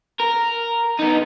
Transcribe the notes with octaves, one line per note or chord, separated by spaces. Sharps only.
A#4
B3 D#4